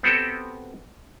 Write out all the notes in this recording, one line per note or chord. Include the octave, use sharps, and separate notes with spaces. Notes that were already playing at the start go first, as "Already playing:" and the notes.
B3 C4 F#4 G4 A4